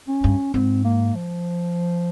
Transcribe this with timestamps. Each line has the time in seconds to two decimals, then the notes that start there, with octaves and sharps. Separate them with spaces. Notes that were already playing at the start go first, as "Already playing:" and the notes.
0.08 C#4
0.24 G2
0.54 G#2 C4
0.85 A#3
1.15 F3